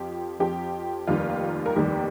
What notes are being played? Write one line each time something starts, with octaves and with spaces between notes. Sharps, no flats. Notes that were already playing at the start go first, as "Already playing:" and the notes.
Already playing: F2 F3 G4
F2 F3 G4
F1 D#2 D#3 G3 F4
A#4
F1 D#2 D#3 G3 G4